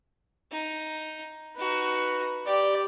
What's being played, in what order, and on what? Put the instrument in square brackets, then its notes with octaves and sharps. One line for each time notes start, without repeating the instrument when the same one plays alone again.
[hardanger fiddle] D#4
[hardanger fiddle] D#4 F#4 [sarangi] B4
[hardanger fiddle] G4 [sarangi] D5